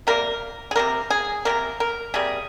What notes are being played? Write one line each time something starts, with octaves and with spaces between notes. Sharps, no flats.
C3 G3 A#3 A#4
G#4
C3 G3 A#3 A#4
G#4
C3 G3 A#3 A#4
A#4
C3 G3 A#3 G#4